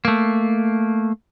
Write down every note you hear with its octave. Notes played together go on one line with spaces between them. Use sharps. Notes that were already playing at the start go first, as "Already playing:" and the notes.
A3 A#3